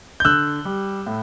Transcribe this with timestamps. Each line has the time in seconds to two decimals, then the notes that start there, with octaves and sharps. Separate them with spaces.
0.20 G6
0.25 D3 E6 F#6
0.65 G3
1.06 A2